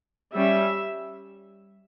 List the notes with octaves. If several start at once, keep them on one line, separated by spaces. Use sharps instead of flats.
G3 C#4 E5